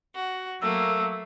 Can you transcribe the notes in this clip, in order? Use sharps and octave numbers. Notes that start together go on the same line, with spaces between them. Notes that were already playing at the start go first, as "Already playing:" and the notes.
F#4
F#3 A3 A#3 E6